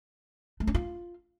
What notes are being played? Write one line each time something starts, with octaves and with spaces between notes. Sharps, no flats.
A3
C#4
F4